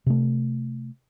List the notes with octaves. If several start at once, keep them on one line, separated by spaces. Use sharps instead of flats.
C3 A3